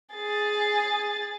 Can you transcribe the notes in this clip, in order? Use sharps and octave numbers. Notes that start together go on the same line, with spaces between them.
G#4 A6